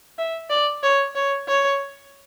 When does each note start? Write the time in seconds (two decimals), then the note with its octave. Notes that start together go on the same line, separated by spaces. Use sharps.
0.18 E5
0.50 D5
0.83 C#5
1.15 C#5
1.48 C#5